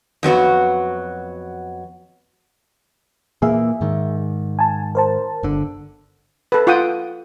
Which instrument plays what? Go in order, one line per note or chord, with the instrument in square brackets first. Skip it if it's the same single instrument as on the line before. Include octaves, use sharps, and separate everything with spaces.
[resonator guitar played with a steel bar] F2 F#3 B3 F#4
[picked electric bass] A#2 E3 A#3 [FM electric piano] G#4 E5
[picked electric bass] G#2 D#3
[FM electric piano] G#5 A5
A#4 C5 A5
[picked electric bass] G1 D3
[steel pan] A4 B4
F4 F#5 G5 D#6